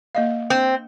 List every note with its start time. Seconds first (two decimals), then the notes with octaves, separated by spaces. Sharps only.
0.15 A#3 D#5 F5
0.50 C4